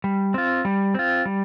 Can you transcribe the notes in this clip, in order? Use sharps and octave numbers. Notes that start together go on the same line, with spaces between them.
G3
C4 F4
G3
C4 F4
G3